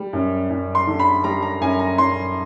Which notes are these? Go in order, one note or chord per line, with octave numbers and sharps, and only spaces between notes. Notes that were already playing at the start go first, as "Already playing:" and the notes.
Already playing: G3
F#2
F#2
C6
D3
B5
G3 A#5
A#5
F#2 G#5
A#5
F#2 C6